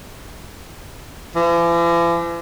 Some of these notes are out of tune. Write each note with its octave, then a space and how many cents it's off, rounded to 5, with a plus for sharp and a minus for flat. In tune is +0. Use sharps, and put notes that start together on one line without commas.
E3 +45